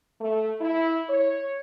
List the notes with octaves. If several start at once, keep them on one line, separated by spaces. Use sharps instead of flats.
A3
E4
C#5